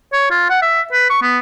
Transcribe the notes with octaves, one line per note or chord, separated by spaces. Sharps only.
C#5
F4
F#5
E5
B4
C#6
B3